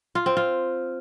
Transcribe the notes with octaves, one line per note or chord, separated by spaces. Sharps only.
F4
C4
F4